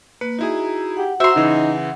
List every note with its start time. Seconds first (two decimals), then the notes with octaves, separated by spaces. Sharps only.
0.21 A#3 B4
0.39 D#4 E4 F#4 G#4 A#5
0.97 G4 F#5
1.20 F#4 C5 E5 A#5 C6
1.36 C#3 E3 D#4